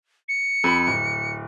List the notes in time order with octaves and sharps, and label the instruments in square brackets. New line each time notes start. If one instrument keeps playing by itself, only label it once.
[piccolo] C#7
[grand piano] F2 B5
D1